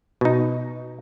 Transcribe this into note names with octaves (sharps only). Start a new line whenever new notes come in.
B2 D#4